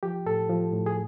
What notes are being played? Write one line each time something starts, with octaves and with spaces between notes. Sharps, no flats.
F3 G4
A2 A4
F3
A2
G#4